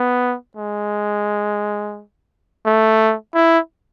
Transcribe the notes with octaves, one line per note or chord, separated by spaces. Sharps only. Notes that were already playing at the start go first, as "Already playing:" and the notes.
Already playing: B3
G#3
A3
E4